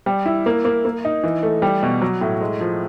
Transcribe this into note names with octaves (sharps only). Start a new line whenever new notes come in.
G3
E4
A#3
A#3
A#3
D#4
E3
A3
G3
B2
F#3
A2
G#3
F3